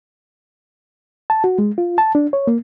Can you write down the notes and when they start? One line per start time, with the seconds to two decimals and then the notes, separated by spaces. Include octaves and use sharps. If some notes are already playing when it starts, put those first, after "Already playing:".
1.30 A5
1.44 F#4
1.59 G#3
1.78 F4
1.98 A5
2.15 D4
2.33 C#5
2.47 A#3